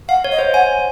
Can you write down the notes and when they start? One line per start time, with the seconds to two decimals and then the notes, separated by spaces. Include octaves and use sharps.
0.09 F5 F#5
0.24 C#5
0.32 D#5
0.39 C5
0.54 F#5 G#5